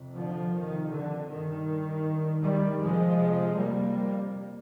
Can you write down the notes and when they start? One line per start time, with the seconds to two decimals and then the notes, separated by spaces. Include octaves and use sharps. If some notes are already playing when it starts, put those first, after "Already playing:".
Already playing: F2 C3
0.15 D3 F3
0.52 F2 C3 D#3
0.91 D3
1.29 G2 D#3
2.06 G2
2.43 D#3 G3
2.80 F2 C3 F3 G#3
3.57 F2 C3 G3 A#3